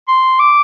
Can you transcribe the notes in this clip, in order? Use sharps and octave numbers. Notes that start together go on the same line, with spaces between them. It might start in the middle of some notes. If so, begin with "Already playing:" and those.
C6
D6